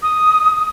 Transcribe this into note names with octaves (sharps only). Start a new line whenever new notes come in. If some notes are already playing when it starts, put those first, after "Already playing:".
D#6